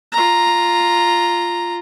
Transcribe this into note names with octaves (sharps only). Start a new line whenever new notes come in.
F4 A#5